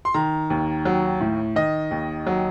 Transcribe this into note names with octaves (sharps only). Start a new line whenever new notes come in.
C6
D#3 A#5
D#2
F#3
A2
D#3 D#5
D#2
F#3